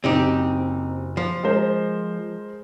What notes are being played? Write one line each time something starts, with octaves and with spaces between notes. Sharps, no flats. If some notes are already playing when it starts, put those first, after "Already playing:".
F#1 C4 D#4 G4
F3
G#3 A#4 C5